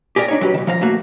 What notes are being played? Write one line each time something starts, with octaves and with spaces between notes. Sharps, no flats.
G4 G#4 A#4 D5
D4 D#4 C#5
F#3 G4 B4
B1 D#3
F3 F5 A#5
A3 A#3 F#4